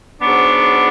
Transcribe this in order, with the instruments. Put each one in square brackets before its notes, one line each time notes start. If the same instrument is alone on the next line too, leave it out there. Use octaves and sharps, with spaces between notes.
[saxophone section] G#2 F#3 B3 D4